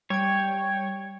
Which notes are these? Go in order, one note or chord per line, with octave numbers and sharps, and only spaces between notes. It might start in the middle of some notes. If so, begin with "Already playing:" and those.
G3 C#5 G5 G#6